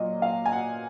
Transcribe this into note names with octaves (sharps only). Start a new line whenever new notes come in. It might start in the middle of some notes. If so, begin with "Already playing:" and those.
Already playing: A#2 F#3 D#5
F5
G#5
F#5